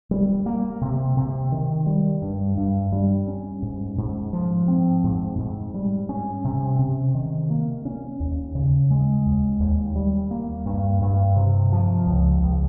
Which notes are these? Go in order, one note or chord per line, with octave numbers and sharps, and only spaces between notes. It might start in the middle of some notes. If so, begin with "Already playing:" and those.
G3
A#3
C3
C3
D#3
G3
G2
G2
G3
C#4
G#2
G#2
F3
C4
G#2
G#2
G3
C#4
C3
C3
D#3
A#3
C#4
D#2
C#3
G#3
D#2
D#2
G3
A#3
G2
G2
C3
F3
C#2
C#2